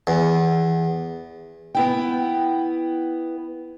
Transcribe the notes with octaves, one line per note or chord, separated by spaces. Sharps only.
E2
B3 E4 G5